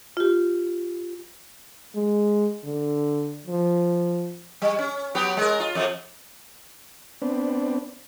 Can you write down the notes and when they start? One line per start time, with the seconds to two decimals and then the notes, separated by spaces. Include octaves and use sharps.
0.17 F4 G4
1.96 G#3
2.65 D3
3.47 F3
4.62 G3
4.79 C#4
5.15 F#3 B3 G4
5.37 G#3 A#4
5.60 F4
5.75 F2 F3
7.22 B3 C4 D4